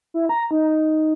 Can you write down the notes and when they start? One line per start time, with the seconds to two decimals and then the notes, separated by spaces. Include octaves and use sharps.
0.14 E4
0.29 A#5
0.51 D#4